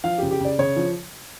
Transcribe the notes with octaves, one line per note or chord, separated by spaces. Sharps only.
F3 F5
G4
C#3
G4
C#3 D5
C#3 C#5
F3